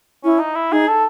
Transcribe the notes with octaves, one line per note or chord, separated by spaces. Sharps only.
C#4 E4
D#4
E4
D#4 G#4
A4